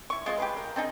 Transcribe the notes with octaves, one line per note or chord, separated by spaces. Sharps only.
E4 C#6
G#3 F4 C5 D#5
G4 G#4 B4
A#4
C4 D4 D#4 G#4